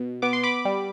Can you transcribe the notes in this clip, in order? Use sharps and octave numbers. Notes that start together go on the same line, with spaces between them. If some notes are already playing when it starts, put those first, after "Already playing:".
Already playing: B2
B3 D6
C6
B5 D6
G3